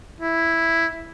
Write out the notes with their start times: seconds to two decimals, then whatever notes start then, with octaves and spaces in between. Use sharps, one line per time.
0.20 E4